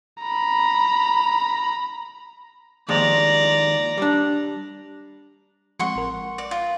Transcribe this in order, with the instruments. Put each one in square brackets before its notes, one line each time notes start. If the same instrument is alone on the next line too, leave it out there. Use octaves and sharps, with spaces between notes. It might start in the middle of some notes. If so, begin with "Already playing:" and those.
[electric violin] A#5 B5
[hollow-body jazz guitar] D#2 F3 G#3 [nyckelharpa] D5 A#5
[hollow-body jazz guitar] G3 D4
[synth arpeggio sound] F3 G#3 C4 [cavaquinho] F#5 C6 C#6
[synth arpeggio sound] A1 A#4
[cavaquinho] D5
F4